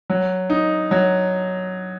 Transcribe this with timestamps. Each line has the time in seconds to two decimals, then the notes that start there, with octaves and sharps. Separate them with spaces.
0.10 F#3
0.50 D#4
0.91 F#3